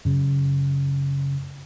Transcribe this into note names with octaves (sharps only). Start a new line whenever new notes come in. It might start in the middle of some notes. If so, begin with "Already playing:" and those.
F#2 C#3